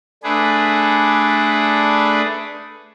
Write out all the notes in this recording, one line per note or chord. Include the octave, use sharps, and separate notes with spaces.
A3 D4 G#4 B4